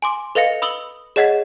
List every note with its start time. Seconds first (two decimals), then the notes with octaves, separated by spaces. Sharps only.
0.02 G#5 C6 D6
0.35 A4 B4 D#5 F5 A#6 C#7
0.62 B5 D#6 E6 F#7 G7
1.16 G#4 C#5 D#5 F#5 G#6 B6